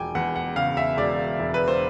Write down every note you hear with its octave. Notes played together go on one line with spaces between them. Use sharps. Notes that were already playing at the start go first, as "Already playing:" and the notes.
Already playing: E1 F3 G5 G#5 D6
E2 F#5
F#5
C#3 F5
E5
E1 D5
E1
B4
C5